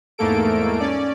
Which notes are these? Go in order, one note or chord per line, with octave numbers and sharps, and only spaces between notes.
E2 G#2 A3 A#3 A4 D7
C#4 D5